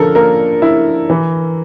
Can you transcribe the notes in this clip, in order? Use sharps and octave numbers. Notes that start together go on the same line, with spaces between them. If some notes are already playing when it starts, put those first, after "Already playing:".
Already playing: D3 F3 A4 A#4
A#3 A#4
E4
E3